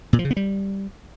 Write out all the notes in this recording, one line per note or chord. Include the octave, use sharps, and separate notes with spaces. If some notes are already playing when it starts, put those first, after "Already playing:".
A#2
F3
C#3
B3
G3